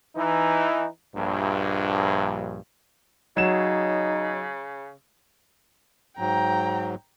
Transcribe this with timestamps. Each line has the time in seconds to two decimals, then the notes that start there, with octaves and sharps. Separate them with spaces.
0.16 E3 D#4
1.16 A#1 G2
3.37 C#3 F#3 D#4 E7
6.19 G#2 F#3 G5 A#5